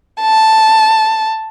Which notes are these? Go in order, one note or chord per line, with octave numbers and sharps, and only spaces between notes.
A5